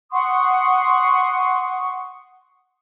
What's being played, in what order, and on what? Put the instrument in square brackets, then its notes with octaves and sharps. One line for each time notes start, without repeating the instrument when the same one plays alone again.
[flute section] F#5 C6 C#6 D#6